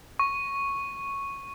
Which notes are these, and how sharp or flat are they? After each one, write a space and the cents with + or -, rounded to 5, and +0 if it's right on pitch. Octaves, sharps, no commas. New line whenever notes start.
C#6 -5